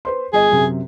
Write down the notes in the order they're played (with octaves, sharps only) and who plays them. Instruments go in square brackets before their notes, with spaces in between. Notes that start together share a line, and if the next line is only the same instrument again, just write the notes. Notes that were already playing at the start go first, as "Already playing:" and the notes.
[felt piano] B4 C5 C6
[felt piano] G1 D#5 [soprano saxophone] G#4
[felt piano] F#2 C3